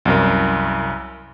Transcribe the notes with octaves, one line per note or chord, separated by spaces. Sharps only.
C2 F#2 A#4